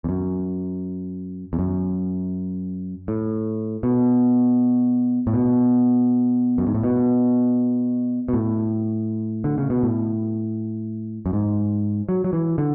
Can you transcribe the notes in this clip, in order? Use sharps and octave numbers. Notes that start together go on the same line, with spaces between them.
E2
F#2
E2
F#2
A2
B2
A2
B2
F#2
G#2
A2
B2
B2
A2
D3
C#3
B2
A2
F#2
G#2
F#3
F#3
E3
D3